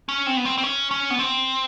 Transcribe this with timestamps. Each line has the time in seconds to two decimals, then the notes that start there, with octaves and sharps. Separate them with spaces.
0.09 C#4
0.27 C4
0.37 B3
0.45 C4
0.58 C4
0.63 C#4
0.91 C#4
1.10 B3
1.19 C4